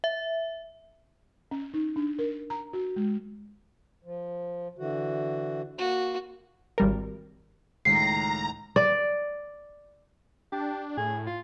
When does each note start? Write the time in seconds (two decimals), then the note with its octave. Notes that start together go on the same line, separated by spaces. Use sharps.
0.04 E5
1.51 C#4
1.74 D#4
1.96 D4
2.19 A#4
2.50 A#5
2.73 F#4
2.96 G#3
4.04 F3
4.78 D3 E3 F#4
5.79 A#3 F#4
6.78 G#1 G3 A#4
7.85 C#2 A2 D#3 A#5 C7
8.76 D5
10.52 D4 G4
10.97 A2 G#4
11.27 F4